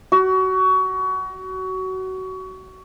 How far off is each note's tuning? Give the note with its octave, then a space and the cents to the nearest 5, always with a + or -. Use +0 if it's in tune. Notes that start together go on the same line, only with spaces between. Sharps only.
F#4 +25